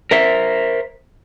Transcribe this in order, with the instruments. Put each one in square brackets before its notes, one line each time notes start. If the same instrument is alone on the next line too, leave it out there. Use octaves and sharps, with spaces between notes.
[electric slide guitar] A#4 C5 E5